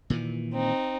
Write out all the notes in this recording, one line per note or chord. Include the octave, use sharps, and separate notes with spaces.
A#2 D#3 E3
C4 D#4